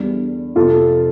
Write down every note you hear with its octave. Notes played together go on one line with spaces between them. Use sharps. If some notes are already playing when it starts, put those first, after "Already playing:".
Already playing: E2 D3 G3
F2 C3 F3 F4 A4